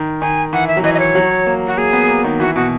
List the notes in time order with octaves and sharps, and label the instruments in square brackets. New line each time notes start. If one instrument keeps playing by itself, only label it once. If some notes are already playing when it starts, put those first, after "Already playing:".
Already playing: [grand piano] D#3
[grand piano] D#3 [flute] G#5
[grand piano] E3 [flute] F#5
[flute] E5
[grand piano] F#3
[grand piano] E3 [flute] D#5
[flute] D#5
C#5
[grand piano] F#3
A#3
[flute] F#4
[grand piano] A#3 [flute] G#4
[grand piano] B3
A#3
D#3
[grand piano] E3 [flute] F#4
[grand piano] B2 [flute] F#4